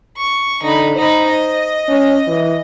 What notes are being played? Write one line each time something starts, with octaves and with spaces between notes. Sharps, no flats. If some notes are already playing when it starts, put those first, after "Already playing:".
C#6
D3 D#4 B5
D#4 C5 B5
D#5
C#4
E3